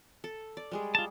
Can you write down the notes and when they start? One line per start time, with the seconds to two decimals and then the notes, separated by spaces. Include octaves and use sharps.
0.24 A4
0.57 D5
0.71 G3 G#3 G#4
0.95 F4 A5